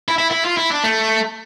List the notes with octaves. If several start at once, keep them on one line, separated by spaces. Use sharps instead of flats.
E4
E4
E4
F4
E4
D4
A3